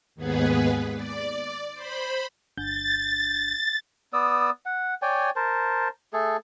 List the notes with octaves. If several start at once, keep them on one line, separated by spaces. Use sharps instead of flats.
D#2 G#2 B3 G#4 B4
D5
C5 B5
G1 G6 A6
B3 D5 D#6 E6
F#5
C#5 D5 G5 G#5
A#4 C5 A5
A3 G#4 A4